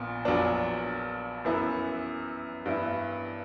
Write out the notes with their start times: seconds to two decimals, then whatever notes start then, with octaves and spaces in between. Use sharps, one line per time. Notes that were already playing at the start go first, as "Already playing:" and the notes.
Already playing: A#1 A#2 B3
0.25 A#1 A#2 F#3 B3 D4
1.45 F#2 E3 B3 E4
2.66 G2 E3 B3 E4